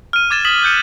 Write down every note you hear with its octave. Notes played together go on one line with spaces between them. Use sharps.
F6 D#7
D6 G#6 A6 E7 G7
D#6 B6 E7 F#7
F#6 G6 C#7 D#7